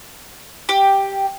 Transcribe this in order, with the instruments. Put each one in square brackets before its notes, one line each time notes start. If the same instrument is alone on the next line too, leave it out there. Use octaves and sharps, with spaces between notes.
[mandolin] G4